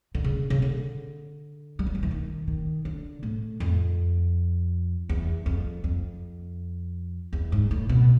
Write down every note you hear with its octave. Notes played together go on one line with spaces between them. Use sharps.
D3
C#3
C#3
D3
G3
F#3
F3
E3
D#3
D#3
D3
A2
F2
E2
F2
F2
E2
G#2
A2
B2